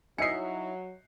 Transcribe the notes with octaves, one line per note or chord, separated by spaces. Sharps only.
F#3 D#4 E4 D#5 E5 G#5 C7 C#7